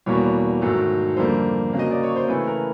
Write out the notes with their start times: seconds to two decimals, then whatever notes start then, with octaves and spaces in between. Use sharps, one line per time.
0.06 E2 B2 G3 A#3 C#5
0.61 G#2 D#3 F#3 A3
1.17 F2 D3 G3 A#3 C5
1.73 C#3 F#3 A#3
1.79 D#5
1.91 D5
2.03 C#5
2.16 C5
2.28 C#3 E3 A3 B4
2.47 A#4